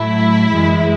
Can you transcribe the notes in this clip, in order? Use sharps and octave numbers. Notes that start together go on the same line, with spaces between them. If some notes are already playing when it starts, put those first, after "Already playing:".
Already playing: A2 F#3 A3 E4
F#2 E3 G#3